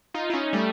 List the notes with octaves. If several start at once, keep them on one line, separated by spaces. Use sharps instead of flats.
D#4 F4
E4
C#4 D#4
G3 A3